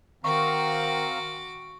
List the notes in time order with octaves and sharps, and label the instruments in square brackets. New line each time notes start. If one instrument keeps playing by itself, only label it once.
[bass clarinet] D#3 [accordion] C4 F5 A#5 [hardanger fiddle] F#4 D6 [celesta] C#6